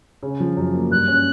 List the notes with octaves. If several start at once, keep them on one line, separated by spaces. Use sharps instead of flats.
C#3
F3
F#2
A#3
G2 F#6
C#4